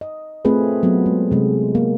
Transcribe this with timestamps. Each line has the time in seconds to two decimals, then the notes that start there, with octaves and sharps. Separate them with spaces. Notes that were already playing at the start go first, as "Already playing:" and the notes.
0.01 D#5
0.45 A3 C4 F4 G#4 B4
0.83 F#3 B3 F4
1.06 G#3
1.31 C3 G#3
1.75 A#3